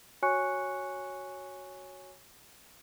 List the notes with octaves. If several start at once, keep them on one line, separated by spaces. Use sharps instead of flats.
F#4 C#5 G#5 C#6 F#6 C#7